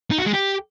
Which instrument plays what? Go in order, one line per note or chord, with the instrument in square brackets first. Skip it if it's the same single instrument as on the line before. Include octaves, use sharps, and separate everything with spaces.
[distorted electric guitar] D#4
F#4
G#3
G4